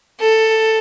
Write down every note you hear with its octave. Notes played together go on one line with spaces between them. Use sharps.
A4